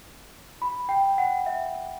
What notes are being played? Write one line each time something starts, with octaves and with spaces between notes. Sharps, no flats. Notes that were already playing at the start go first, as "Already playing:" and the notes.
B5
G5
F#5
E5